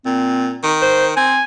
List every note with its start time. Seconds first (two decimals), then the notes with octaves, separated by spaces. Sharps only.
0.06 A#2 C4
0.63 D#3
0.82 C5
1.17 C4 G#5